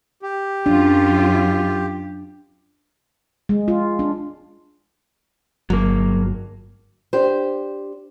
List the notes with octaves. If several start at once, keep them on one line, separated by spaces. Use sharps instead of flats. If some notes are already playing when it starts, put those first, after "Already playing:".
G4
F#2 D4 F4
G#3
F4
D4
G1 F#3 A#3
D4 G4 C5